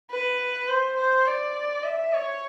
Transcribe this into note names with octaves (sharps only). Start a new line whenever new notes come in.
B4
C5
C5
D5
E5
C#5